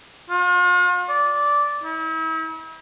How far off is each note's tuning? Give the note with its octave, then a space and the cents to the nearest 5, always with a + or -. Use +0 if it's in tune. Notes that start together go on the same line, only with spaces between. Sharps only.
F4 +45
D5 -10
E4 -40